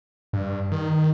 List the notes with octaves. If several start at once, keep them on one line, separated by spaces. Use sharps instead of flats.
G2
D#3